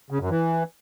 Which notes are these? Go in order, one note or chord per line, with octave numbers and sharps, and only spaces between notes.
C#3
F#2
E3